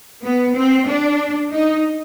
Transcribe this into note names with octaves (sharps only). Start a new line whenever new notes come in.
B3
C4
D4
D#4